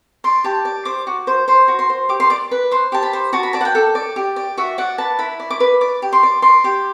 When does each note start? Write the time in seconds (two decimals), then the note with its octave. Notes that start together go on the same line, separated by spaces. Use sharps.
0.24 D5 C6
0.44 G4 A5
0.65 D5
0.85 C5 D6
1.07 F#4
1.27 C5
1.48 C5 C6
1.68 F#4
1.79 C6
1.89 C5
2.09 G4 D6
2.20 C6
2.30 D5 D6
2.51 B4
2.71 C5 C6
2.92 G4 A5
3.03 B5
3.13 C5
3.33 F#4 A5
3.43 B5
3.53 D5 A5
3.61 F#5
3.65 G5
3.75 A4
3.95 D5
4.16 G4
4.36 D5
4.58 F#4 E5
4.78 D5 F#5
4.98 B4 A5
5.19 E4 B5
5.40 D5
5.50 D6
5.60 B4
5.81 D5 D6
6.02 G4
6.13 C6
6.23 D5
6.42 D5 C6
6.64 G4